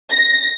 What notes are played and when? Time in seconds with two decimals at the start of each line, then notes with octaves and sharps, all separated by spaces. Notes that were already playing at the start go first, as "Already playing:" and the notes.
0.12 A#6